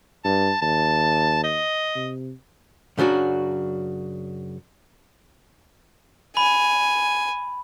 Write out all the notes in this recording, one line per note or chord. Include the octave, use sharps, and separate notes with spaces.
G2 A5
D#2 A5
D#5
C3
F#2 C#3 F#3 D4 F#4
G#5 B5